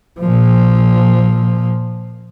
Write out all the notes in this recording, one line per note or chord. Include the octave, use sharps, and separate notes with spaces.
A#2 F3